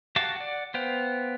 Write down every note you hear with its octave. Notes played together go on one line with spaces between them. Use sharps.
F#4 G4 F5 A5 D6
D5 F#5
B3 C5 F5 G5